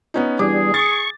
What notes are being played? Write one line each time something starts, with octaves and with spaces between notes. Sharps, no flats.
B3 C#4 D#4
E3 G3 B3 D4 G#4 D6
C#6 A6